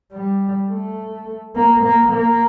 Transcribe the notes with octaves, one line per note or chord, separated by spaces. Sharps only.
G3
A3
A#3
A#3
A#3